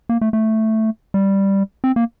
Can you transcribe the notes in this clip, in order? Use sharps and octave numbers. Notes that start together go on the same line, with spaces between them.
A#3
A3
A3
G3
C4
A#3